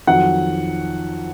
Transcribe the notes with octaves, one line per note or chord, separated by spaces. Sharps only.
F2 D#3 F#3 F#5